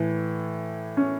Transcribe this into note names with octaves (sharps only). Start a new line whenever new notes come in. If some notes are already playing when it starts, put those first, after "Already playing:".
Already playing: A2 E3
C#4